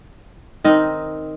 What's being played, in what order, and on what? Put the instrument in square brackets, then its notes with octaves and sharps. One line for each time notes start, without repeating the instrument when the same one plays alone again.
[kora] D#3 C4 D#4 D#5